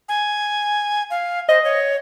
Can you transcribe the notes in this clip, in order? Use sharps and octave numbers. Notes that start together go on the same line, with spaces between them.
G#5
F5
C5 D#5
C#5